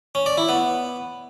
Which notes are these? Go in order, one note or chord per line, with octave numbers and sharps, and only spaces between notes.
C#4
D5
E4
B3